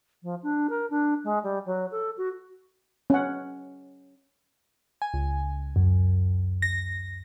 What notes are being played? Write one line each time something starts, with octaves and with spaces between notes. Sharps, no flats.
F3
D4
A#4
D4
G#3
G3
F#3
A4
F#4
C#4 F#5
G#5
C#2
F#2
A#6